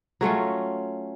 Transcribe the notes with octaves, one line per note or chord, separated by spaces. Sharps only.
F#3 A3 C#4 F4